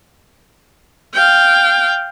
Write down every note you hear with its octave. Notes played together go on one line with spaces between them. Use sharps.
F5 G5